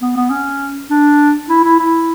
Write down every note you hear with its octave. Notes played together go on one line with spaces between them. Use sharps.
B3
B3
C#4
D4
E4
E4
E4